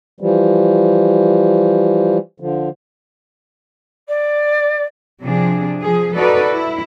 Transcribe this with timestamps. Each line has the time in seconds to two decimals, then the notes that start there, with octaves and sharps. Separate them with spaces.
0.20 E3 F3 G3
2.40 D3 F3
4.08 D5
5.23 C3 F3 D4 G#4
5.81 F3 G#4
6.15 D#4 F#4 A4 B4 D5
6.52 E4